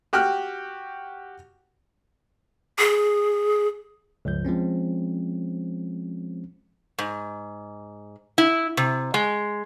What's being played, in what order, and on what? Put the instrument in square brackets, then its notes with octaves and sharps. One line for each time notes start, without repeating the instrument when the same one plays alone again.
[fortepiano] F#4 G4 G5 F6 F#6
[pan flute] G#4
[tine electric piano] C#2 G2 F3 G6
F3 G#3 C4 C#4
[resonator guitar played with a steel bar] G#2
E4
C3
G#3